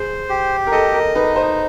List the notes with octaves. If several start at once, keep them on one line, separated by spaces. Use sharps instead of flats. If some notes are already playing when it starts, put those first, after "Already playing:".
Already playing: G#4 C5
G4
A#4
A4 D#5
A#4
D#4 B4
C5